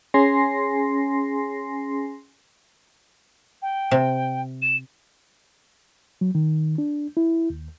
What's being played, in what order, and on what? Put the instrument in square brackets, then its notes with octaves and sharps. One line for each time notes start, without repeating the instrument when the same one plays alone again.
[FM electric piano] C#4 G#4 G#5 C6 A#6 C7
[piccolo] G5
[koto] C3
[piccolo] E7
[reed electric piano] F#3
D#3
D4
E4
D#2